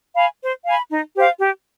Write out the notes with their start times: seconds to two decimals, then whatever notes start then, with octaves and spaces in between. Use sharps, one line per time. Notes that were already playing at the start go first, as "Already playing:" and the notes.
0.15 F5 G#5 B5
0.41 C5
0.65 F5 G#5 B5
0.90 D#4
1.16 G4 C5 F5
1.40 G4